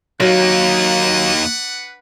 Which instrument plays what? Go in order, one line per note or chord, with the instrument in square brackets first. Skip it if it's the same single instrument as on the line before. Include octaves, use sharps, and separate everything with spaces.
[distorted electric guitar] D#2 A#3 [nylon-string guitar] F#3 [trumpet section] D4 B4 F#5